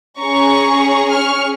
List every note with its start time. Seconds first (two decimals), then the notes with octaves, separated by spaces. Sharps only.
0.21 C#4 G#4 A#5 C#6
1.13 C#6 F6